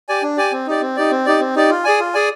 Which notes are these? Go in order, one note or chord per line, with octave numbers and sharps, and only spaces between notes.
G4 D5 G#5
D4
G4 D5 G#5
C4
D#4 G4 D5
C4
D#4 G4 D5
C4
D#4 G4 D5
C4
D#4 G4 D5
F4
G#4 D5 G#5
F4
G#4 D5 G#5